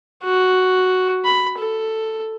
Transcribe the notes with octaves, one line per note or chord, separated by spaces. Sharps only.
F#4
B5
A4